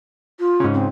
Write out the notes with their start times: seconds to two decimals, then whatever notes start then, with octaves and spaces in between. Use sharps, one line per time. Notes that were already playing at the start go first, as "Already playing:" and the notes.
0.40 F4
0.60 G#2 C#3
0.74 C4